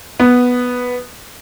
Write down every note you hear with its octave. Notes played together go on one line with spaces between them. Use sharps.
B3